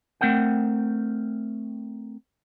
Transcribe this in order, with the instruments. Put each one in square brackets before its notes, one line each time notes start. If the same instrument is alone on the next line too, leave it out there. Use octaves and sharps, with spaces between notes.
[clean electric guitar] A3 C4 A#4 F#5 G5